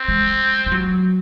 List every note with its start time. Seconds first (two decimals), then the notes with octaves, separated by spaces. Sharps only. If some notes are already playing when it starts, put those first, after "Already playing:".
Already playing: C4
0.08 G#3
0.66 G#3
0.72 F#3